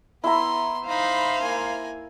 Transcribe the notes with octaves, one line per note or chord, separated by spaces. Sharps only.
B3 E4 E5 A#5 C6
D#4 C5 F5 B5
A#3 G#5